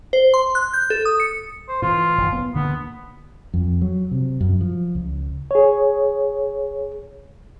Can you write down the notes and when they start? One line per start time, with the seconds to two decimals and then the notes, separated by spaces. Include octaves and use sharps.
0.13 C5
0.34 C6
0.55 F#6
0.74 G6
0.90 A4
1.05 D#6
1.20 C#7
1.68 C5
1.82 A2 E3 F4
2.18 F#1 D#3
2.33 B3
2.54 D2 D3 A#3 B3
3.54 F2
3.82 F#3
4.11 C3
4.41 F#2
4.61 F3
4.95 C#2
5.51 G#4 C#5